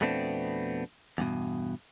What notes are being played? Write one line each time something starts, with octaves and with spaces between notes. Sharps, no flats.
F2 B2 A3 B3 C4 D4
E2 G2 B2